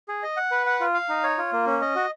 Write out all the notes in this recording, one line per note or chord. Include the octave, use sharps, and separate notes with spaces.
G#4
D#5
F#5
B4
F#5
F4
F5
D#4
C#5
F4
A#3
C#4
D#5
F#4